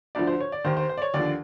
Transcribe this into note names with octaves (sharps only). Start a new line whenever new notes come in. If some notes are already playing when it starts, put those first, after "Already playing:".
D2 D3 F3 D5
C5
C#5
D5
D#2 D#3 C5
C5
C5
D5
C#5
D#2 D3 F3 D5